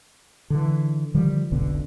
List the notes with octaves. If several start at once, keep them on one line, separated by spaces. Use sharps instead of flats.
D3 E3
D3 D#3 F3 G3
F1 B1 B2 D3